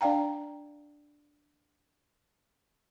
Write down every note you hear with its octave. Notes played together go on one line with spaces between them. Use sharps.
D4 D5 F5 G5 A#5